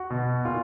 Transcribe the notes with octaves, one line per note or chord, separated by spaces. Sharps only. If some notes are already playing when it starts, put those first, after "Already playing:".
Already playing: F#4
B2
A#2 F4